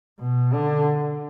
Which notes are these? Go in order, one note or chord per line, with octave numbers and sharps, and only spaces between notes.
B2
D3